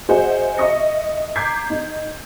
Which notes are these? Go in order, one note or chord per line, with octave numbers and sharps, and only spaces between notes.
F#4 G#4 C5 D#5 E5 F#5
D#5 E5 C#6 D#6 A#6 C#7
A#5 D6 G6 G#6 B6 C7
D#4